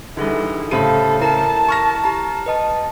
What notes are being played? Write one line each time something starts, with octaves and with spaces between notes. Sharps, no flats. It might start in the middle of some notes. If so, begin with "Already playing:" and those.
D3 E3 G3 D#4 G#4 A4
A2 C#3 G4 A4 C5 F5 D#7
E4 A#4 A5 A#5
C#6 F6 A#6
G4 A#5
B4 D#5 A5